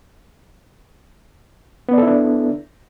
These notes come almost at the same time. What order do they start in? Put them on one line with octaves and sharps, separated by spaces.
B3 D5 A4 E4 D4